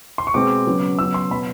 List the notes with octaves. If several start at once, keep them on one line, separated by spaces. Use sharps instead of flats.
C6
C#6
B2 G#3 C4 D6
C#3 F#3 B3
C#3 F#3 B3 E6
C6
B2 F#3 B3 B5